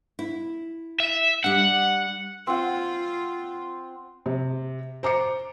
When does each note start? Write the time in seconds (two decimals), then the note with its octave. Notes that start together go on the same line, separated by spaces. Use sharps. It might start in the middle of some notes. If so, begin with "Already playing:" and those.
0.19 E4
1.00 E5
1.44 G3 D4 F#5
2.47 C4 F4 F#5
4.26 C3
5.03 C5 A#5 D6 C#7